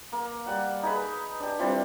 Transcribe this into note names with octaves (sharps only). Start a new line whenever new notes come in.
A#3
G3 F#5
D#4 G#4 B4 B5
D4 G4
E3 F3 G3 C4